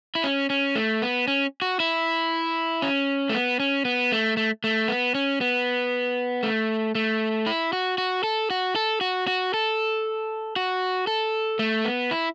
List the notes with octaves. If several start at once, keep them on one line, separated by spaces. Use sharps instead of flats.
E4
C#4
C#4
A3
B3
C#4
F#4
E4
C#4
A3
B3
C#4
B3
A3
A3
A3
B3
C#4
B3
A3
A3
E4
F#4
F#4
A4
F#4
A4
F#4
F#4
A4
F#4
A4
A3
B3
E4